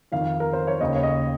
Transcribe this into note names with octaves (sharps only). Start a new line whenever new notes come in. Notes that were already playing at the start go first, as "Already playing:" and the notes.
F2 D#3 F5
A#4
C5
C#5
D#2 C#3 D#5
C#5
D#5